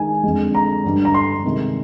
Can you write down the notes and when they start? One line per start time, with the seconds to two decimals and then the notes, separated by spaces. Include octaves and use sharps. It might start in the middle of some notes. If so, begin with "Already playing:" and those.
Already playing: D#3 G#3 D#4 G#5
0.23 F2 D3 G#3
0.55 A#5
0.84 G2 D3 G3
1.05 A#5
1.14 C6
1.45 C3 D#3 G#3